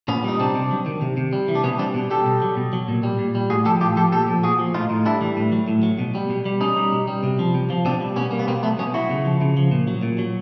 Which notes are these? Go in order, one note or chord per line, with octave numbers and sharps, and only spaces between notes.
A#2 B3 C#4
G3 D#4
C3 C4 D4
C3
F#3
D#3
C3
C3
G3
E3
D4
B2 B3 C#4
G3 C4 D4
B2
G3 G4 A4
B2
F#3
B2
F#3
A#2
G3
A#2
G3
A2 F#4 G#4
F3 G4 A4
A2 F4 G4
F3 G4 A4
A#2 G4 A4
F3
A#2 F#4 G#4
F3
A2 D#4 F4
A2
G3 D4 E4
E3
A2
F#3
A2
F#3
B2
G3
B2
G3
B2 C#4 D#4
G3
B2
G3
C3
F3
C3
F3
B2 C4 D4
G3
B2 B3 C#4
G3 A#3
B3
B2 A#3 C4
F#3 A3 B3
B2 B3 C#4
F#3 E4 F#4
C#3
F3
C#3
F3
A#2
F#3
A#2
F#3